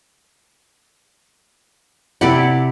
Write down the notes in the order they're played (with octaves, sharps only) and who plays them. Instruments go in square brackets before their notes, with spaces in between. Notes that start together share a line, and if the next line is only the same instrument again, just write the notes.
[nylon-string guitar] C3 F#5 [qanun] E4 G4 D5